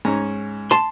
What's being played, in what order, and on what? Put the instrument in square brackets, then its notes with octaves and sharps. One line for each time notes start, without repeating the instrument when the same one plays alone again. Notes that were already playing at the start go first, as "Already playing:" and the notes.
[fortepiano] G#2 C#4 A#5
[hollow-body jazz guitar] A5 C6